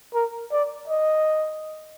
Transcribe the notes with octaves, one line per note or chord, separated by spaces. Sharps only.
A#4
D5
D#5